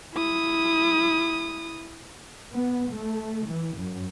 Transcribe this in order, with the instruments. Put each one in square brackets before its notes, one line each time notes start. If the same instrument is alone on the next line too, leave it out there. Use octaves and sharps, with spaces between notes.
[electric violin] E4 D#6
[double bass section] B3
A3
E3
F#2